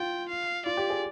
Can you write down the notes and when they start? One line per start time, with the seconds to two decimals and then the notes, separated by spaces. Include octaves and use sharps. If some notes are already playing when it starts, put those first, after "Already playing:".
Already playing: F4 G5
0.29 F5
0.66 F4 D5
0.77 G4
0.90 G#4